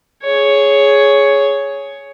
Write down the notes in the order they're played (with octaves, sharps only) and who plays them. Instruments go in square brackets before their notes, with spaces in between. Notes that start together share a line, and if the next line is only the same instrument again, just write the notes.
[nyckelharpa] G#4 C#5